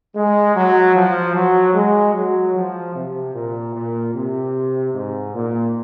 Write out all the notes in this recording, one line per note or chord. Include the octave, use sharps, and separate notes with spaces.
G#3
F#3
F3
F#3
G#3
F#3
F3
C3
A#2
A#2
C3
G#2
A#2